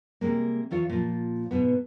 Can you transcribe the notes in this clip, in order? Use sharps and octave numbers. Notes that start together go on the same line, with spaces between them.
C3 G3 G#3 A#3
E2 E3 F4 C#5
A#2 F3
G#2 B2 B3